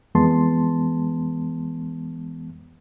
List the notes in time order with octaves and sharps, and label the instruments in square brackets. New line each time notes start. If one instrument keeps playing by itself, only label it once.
[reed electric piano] F2 E3 G#3 B3 A5 C6